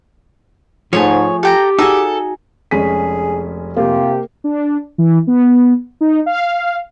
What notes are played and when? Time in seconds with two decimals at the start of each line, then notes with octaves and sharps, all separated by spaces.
0.93 G#2 F3 A3 G#4 C#5
1.43 G4 A4 G5 A#5
1.79 D#4 F#4 G#4 A4
2.71 F1 G#3 C#4 G#4 B6 D#7
3.76 C3 A#3 F4 G4
4.44 D4
4.98 E3
5.27 B3
6.01 D#4
6.26 F5